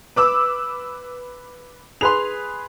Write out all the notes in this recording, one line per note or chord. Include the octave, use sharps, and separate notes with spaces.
B4 D6 E6
G#4 B4 C6 F7